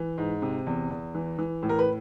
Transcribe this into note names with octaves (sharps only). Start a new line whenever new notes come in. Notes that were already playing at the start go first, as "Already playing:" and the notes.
Already playing: E3
G#2
C3
E2
E2
E3
E3
A2
A#4
B4